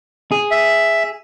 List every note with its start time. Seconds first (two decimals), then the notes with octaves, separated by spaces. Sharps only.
0.32 G#4
0.51 E5